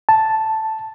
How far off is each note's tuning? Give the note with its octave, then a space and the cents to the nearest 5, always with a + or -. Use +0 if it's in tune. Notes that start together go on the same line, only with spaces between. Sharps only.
A5 +0